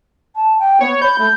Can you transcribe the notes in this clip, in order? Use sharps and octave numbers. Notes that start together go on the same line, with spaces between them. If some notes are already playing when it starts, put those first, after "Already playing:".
A5
G5
B3 C#5
B5 G6
A3